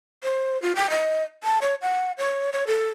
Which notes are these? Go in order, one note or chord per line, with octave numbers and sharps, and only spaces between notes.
C5
F4
G5
D#5
A5
C#5
F#5
C#5
C#5
A4